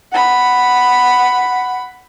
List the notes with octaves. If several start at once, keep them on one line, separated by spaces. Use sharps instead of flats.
F#5 B5